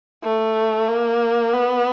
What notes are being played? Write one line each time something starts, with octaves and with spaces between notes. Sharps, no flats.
A3
A#3
B3